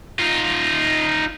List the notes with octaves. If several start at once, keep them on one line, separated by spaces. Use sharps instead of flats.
D#4 F4